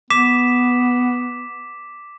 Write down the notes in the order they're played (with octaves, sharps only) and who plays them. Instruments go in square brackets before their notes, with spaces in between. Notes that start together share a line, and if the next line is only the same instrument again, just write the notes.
[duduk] B3 [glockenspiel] D6 B6 E7